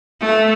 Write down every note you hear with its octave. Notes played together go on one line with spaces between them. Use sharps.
A3